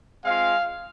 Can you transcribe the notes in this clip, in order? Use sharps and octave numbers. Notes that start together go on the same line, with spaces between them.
G#3 C4 F4 F5